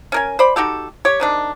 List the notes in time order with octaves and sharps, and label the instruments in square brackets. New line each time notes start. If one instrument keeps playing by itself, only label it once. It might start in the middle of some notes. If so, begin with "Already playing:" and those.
[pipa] C#4 A#4 G#5
C5 D5 B5
D#4 F#4 G4 A4
G4 C#5
C3 D#3 D4